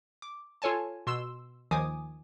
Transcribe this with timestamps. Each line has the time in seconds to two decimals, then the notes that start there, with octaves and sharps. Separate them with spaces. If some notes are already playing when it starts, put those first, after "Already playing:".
0.22 D6
0.62 F4 A4 C#5 G#5 A5
1.07 B2 C6 E6 E7
1.71 D#2 D#3 F3 G#5 D6 D#6